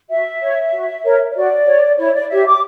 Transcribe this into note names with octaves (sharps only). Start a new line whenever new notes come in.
F#4 E5
C#5
F#4
A#4 C#5
C#5
F#4 D5
C#5
E4 C#5
D5
G4 C#5 E5
D6